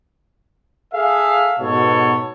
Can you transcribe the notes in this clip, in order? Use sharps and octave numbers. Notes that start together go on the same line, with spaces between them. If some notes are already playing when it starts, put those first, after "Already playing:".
G#4 A4 E5 F5
G#2 B2 B3 A4 C#5